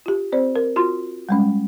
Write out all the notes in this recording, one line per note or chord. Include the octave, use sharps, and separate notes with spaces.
F4 G4
C4 C5 D5
A#4
F4 F#4 C6
G3 G#3 C#4